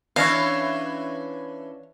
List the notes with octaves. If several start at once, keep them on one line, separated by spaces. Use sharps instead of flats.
E3 C#4 D4 C#5 F5